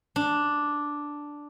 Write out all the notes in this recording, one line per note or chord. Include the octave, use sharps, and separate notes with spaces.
D4